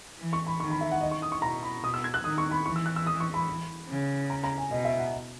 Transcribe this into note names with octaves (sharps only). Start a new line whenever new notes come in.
E3
C#6
B5
D#3 C#6
B5
E5
F#5
D#3 D#5
C#6
D#6
C#6
B2 A#5
B5
B2 D#6
E6
G#6
F#6
D#3 D#6
C#6
B5
E3 C#6
E6
F#6
E6
D#6
C#6
B5
C#3
A#5
A#5
G#5
B2 D#5
E5
F#5